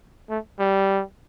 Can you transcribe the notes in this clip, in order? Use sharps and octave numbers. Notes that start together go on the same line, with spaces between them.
A3
G3